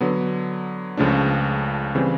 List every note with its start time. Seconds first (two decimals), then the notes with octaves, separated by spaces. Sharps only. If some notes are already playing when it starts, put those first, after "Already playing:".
0.01 D3 F#3 B3
0.97 C#2 C#3 F3 A3 D4
1.95 C#3 E3 G3 C4